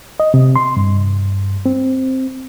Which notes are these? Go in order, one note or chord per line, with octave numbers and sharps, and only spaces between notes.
D#5
C3
C6
G2
C4